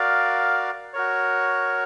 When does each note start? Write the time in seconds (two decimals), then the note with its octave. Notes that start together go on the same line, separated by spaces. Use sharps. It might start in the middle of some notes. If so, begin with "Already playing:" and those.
Already playing: F#4 A#4 D5 F5
0.93 F#4 A#4 C#5